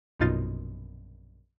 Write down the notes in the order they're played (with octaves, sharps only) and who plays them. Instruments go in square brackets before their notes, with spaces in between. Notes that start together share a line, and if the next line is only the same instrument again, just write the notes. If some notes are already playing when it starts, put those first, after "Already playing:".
[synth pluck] A#1 F#2 B2 D#4 F4 A6